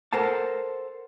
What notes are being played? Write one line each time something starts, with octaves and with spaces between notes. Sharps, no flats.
A4 A#4 C5 F#5 A5